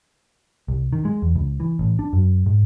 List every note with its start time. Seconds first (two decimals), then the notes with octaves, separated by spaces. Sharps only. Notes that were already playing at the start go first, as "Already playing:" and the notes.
0.68 C2
0.93 D#3
1.05 G#3
1.22 E2
1.36 C#2
1.60 E3
1.79 A1
1.99 D4
2.13 F#2
2.46 G#2